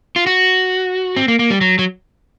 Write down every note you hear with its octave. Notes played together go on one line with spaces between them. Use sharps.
F4
F#4
C4
A#3
A#3
G3
F#3
F#3